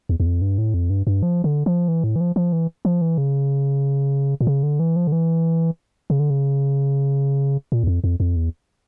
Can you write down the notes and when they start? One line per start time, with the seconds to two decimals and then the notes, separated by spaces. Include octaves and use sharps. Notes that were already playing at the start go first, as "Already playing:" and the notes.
0.09 E2
0.20 E2
0.26 F2
0.42 G2
0.58 A2
0.74 F2
0.90 G2
1.07 G2
1.23 F3
1.44 D3
1.66 F3
1.88 E3
2.04 A2
2.16 E3
2.21 F3
2.36 F3
2.52 E3
2.85 F3
3.02 E3
3.18 C#3
4.41 A#2
4.47 C#3
4.63 D3
4.80 E3
4.96 F3
5.07 D3
5.12 E3
6.10 C#3
6.20 D3
6.30 C#3
7.72 A#2
7.83 E2
7.87 F2
8.04 F2
8.20 F2
8.36 E2